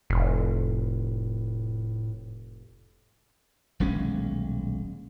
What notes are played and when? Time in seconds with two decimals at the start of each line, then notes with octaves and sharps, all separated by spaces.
0.10 F1 A2
3.80 D#1 B1 G#3 C#4